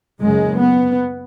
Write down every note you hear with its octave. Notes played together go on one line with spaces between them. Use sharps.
F#1 F#2 C#3 G#3
B3